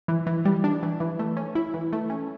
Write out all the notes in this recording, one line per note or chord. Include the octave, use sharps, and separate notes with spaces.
E3
E3
G3
D4
E3
E3
A3
C#4
E4
E3
A3
C#4